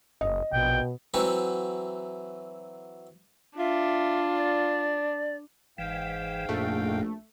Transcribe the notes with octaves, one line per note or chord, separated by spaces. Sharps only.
F#1 D#5
A#1 B2 G5
E3 F#3 C4 E4 F#4
D4 F4 E5
D5
G1 G#2 E3 F5 G5
A#1 F#2 A#2 A3